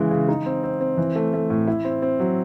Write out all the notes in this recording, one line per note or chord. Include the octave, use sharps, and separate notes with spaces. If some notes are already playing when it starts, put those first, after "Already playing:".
Already playing: C#3 E3 G#3
C#3
D#4
C4
C4
C4
E3
A3
A3
A2
E4
C4
C4
F#3